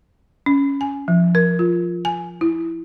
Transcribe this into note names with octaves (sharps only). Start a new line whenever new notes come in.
C#4
G#5
F3
A#4
F4
G#5
E4